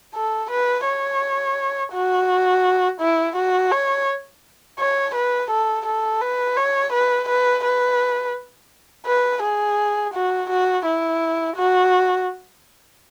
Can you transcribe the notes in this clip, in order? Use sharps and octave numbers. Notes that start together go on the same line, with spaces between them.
A4
B4
C#5
F#4
E4
F#4
C#5
C#5
B4
A4
A4
B4
C#5
B4
B4
B4
B4
G#4
F#4
F#4
E4
F#4